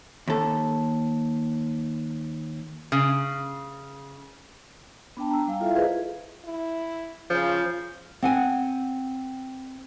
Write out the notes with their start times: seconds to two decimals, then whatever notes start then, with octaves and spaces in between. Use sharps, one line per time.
0.28 D#2 A4
2.92 C#3
5.17 B3 D4 G5 A5
5.30 A#5 E6
5.47 G3 F5 G5 G#5
5.60 E4 F4 A4 E5 F5
5.75 G#4 B4 C5 D#5
6.45 E4
7.30 C#3 F3
8.22 C4 F#5 G#5